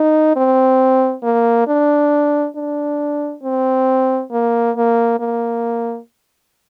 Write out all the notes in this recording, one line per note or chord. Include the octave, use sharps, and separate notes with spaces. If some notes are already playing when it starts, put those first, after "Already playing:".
Already playing: D#4
C4
A#3
D4
D4
C4
A#3
A#3
A#3